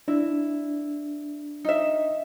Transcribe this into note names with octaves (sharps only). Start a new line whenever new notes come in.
D4 E4
D#4 E5